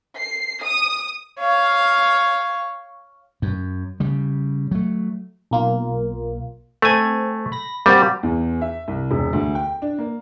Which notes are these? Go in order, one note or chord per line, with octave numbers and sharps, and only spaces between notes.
C7
D#6
C#5 F5
F#2
C#3 G3
F#3 A3
B1 A#3 F4
A3 C4 G#5
B5 A#6
G3 A#3 C4 F#4
E2
E5
C2
E1
D2
G5
D4
A#3